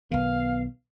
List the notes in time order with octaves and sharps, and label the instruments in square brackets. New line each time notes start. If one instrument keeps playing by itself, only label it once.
[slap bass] B1 D#3 [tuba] B3 [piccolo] F5